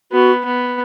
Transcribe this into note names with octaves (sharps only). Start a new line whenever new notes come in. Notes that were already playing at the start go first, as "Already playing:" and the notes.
B3 F#4
B3